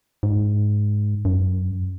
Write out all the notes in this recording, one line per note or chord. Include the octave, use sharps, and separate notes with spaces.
G#2
F#2